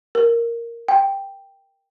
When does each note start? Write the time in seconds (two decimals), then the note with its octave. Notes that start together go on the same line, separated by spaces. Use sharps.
0.15 A#4
0.88 G5